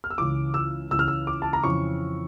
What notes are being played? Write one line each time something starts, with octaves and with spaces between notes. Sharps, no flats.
F6
E6
C#2 C#3 E3 D6
E6
C#2 C#3 E3 E6
F6
E6
D6
A5
A#5
F2 C#3 E3 C#6